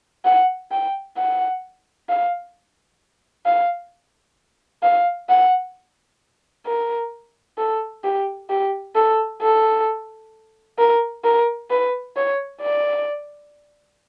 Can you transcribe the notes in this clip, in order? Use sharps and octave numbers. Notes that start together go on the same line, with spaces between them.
F#5
G5
F#5
F5
F5
F5
F#5
A#4
A4
G4
G4
A4
A4
A#4
A#4
B4
C#5
D5